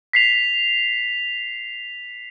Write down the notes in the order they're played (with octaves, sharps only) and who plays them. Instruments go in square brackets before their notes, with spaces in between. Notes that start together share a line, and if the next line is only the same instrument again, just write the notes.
[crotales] B6 C7 F7